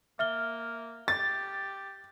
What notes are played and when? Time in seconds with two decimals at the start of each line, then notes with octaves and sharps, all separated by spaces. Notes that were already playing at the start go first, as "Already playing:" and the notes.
0.19 A#3 E5 F6 G7
1.08 G4 A6